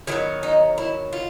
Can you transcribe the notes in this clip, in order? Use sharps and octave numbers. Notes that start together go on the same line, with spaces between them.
D#3 F#3 B3 E4
D#4
E4
F4